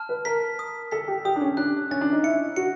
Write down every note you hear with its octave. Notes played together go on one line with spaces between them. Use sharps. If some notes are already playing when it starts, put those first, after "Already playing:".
Already playing: A5 F6
B4
A#4 B6
D#6
A4 B6
G4
G4 D#6
D4
C#4
D4 F#6
C#4 A6
D4
D#4
E4 C#7
F#4 C#7